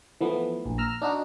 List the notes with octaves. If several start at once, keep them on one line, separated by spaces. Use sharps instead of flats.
E3 F3 A3 B3
A#1
A#5 E6 F6
D4 D#4 F#4